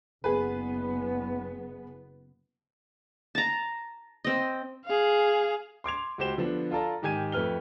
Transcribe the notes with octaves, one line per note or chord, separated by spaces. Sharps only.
F#1 B3 G#4 B4
A5 A#5
C4 D#5
G#4 F5
C6 D6 G#6 F7
C#2 F#4 G4 C5 E7 G7
D3 F3 B3 D4
F4 A4 D5 A5 A#5
G#2 D#3 G4 G#5 G#6 D#7
F2 A3 B4 F6 G7